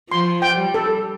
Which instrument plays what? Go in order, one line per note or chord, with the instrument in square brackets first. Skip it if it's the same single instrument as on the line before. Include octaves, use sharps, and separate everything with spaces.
[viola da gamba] F3 [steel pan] C6
[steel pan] G5
[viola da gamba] G3
[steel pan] A4